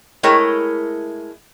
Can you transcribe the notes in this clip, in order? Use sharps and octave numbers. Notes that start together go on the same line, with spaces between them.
G#3 A3 E4 A#4 C#5 G5